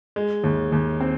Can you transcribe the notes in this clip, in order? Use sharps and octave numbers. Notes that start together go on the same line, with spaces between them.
G#3
D#2
D#2
C4